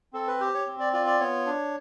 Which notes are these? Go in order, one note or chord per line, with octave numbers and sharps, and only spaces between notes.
C4 A4
B4
G4 C5
C#5
C4
D5
F4 D5
D5
B3 C#5
D4